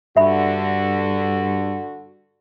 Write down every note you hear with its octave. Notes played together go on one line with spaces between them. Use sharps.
G2 D3 F#4 E5 G#5 B5